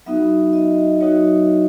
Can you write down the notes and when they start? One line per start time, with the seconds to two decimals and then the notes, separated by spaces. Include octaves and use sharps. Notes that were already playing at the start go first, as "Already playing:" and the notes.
0.06 F#3 B3 D#4 F#4 E5
0.53 D#5
1.01 F#3 B3 D#4 F#4 C#5